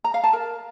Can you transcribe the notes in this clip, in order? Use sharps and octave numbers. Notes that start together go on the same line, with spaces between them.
A#5
F5
A5
A#4